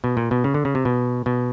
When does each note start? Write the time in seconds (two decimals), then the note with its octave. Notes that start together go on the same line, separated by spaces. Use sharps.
0.04 B2
0.17 A#2
0.31 B2
0.44 C#3
0.54 D3
0.65 C#3
0.75 C3
0.85 B2
1.26 B2